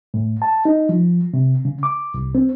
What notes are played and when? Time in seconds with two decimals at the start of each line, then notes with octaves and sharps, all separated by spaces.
0.14 A2
0.42 A5
0.65 D#4
0.89 F3
1.34 C3
1.65 C#3
1.83 D6
2.14 C2
2.35 C4